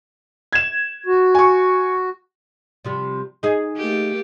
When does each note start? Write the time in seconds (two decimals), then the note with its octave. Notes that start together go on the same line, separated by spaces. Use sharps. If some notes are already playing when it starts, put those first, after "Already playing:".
0.53 G#6 E7
1.06 F#4
1.35 G#5 C#6
2.85 C3 F3 G3
3.43 D#4 G#4
3.77 A3 A#3 G4